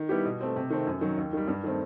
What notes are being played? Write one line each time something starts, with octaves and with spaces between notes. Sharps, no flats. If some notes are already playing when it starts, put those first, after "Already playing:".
Already playing: D#3
G3 B3 E4 G4
B2
A3 C4
C3
D#3 A3 C4
F#2
D#3 F#3
D#2
D#3 G3
G2
D#3 A3 C4